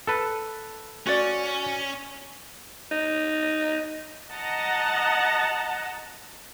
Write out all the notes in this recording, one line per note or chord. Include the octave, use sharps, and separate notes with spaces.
A4 B4
C#4 F#4 D5
D#4
D#5 F#5 A5 A#5